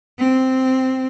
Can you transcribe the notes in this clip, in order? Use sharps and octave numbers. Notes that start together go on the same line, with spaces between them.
C4